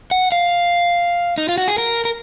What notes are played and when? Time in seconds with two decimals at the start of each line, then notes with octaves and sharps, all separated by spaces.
0.11 F#5
0.32 F5
1.38 D#4
1.49 F4
1.58 F#4
1.68 G#4
1.78 A#4
2.05 A#4